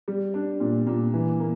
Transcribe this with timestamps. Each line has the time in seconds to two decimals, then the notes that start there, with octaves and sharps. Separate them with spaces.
0.08 G3
0.34 D4
0.60 A#2
0.87 A#2
1.14 E3
1.40 A#3